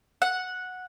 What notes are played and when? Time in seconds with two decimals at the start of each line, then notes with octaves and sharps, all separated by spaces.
0.22 F#5